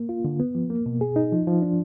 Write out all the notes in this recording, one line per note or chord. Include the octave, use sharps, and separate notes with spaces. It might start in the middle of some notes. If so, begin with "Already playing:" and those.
Already playing: A#3
F4
D3
B3
F3
A#3
B2
G#4
D#4
F3
F3
D4